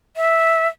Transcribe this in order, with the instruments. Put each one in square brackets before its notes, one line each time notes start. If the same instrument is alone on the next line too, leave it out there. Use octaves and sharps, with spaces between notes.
[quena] E5